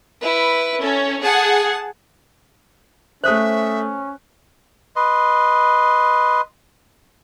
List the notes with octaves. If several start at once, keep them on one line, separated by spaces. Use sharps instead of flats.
E4 B4
C#4 A4
G#4 F#5 A5
A3 C#4 C5 E5 D#6 F#6
B4 D#5 C6